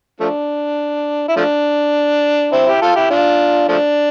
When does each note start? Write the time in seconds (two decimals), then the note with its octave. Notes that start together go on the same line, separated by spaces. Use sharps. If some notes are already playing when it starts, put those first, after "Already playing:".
0.20 F3 A3 D4
1.28 E4
1.36 F3 A3 D4
2.52 C4 E4
2.67 E4 G4
2.82 F4 A4
2.96 E4 G4
3.10 D4 F4
3.68 F3 A3 D4